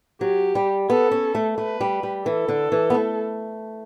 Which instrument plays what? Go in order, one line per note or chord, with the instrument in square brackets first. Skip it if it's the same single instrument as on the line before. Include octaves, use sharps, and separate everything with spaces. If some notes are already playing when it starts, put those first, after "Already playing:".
[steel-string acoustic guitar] F#3 [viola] G4
[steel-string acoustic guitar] G3
[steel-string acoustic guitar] B3 [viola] A4
[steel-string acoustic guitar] C#4
A3
[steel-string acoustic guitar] A3 [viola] B4
[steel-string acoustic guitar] G3
G3
[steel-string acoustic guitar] E3 [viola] A4
[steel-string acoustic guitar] D3
E3
B3
A3